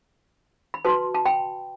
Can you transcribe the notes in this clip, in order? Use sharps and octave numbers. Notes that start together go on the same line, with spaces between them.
B5
F#4 B4 A5 C6
A5
G5 B5